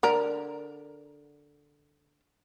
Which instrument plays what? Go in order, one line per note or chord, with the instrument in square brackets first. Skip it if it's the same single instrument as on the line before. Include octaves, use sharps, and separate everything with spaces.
[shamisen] D3 A#4